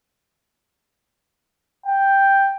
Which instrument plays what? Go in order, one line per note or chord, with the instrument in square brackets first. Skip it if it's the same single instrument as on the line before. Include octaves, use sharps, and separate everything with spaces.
[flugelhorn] G5